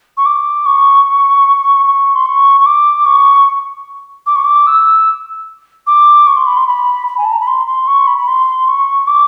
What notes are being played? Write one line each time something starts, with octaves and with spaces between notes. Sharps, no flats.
C#6
D6
C#6
C#6
C6
C#6
C#6
D6
C#6
D6
C#6
D6
E6
D6
C#6
C6
B5
C6
B5
B5
G#5
A5
A#5
B5
C6
C6
C#6
B5
B5
C6
C#6
D6